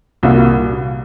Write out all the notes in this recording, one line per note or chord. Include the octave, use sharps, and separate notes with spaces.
C2 A#2 G3 A#3 F#4